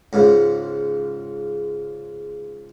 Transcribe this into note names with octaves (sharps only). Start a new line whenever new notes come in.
C#2 G#2 C#3